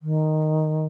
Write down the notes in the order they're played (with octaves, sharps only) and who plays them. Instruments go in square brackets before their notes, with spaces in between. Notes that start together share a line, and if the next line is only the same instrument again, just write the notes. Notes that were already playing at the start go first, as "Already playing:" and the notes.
[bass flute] D#3